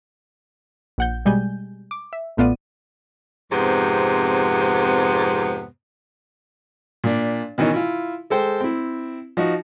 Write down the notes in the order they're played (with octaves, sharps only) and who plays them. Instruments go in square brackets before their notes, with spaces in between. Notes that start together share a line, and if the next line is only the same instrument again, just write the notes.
[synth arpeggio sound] A#1 F#5 G6
B2 G3 G#3 G#5 G6
D6
E5
A1 A2 B3 F4 D5 D#7
[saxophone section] F2 G#2 C3 B3
[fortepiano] A#2 D4
B2 D#3 E3 C#4 D#4
E4 F4
G#3 A4 C5 G5
C4 E4
F3 D#4 F#4